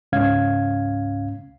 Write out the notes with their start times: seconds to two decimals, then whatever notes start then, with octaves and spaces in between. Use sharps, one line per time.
0.12 C#2 G#2 C#4 F5 G#6